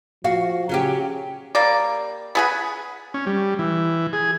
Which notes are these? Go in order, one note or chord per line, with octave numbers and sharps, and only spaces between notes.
F3 F#4 F5
C#3 F#3 C#4 G4
G3 A#3 D5
B3 G#4 B4
C#4
G3
E3
G#4